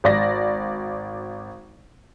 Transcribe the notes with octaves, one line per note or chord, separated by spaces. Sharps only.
G#1 D5 A#6